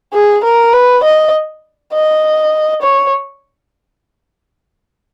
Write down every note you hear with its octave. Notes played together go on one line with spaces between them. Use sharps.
G#4
A#4
B4
D#5
D#5
C#5